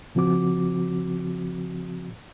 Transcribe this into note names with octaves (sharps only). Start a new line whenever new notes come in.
C#3 F3 C4 F#4 D6